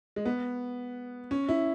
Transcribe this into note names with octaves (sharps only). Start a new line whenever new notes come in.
G#3
B3
C#4
E4